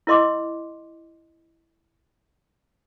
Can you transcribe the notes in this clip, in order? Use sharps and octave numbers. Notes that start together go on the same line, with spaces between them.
E4 A#4 D#5 C6 D6